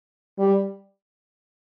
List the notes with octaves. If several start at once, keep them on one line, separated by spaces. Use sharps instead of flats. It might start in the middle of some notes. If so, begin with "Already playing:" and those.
G3